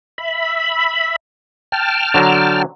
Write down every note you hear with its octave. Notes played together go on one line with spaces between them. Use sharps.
E5 B5
G5 A5 F6
D3 F#3 A#5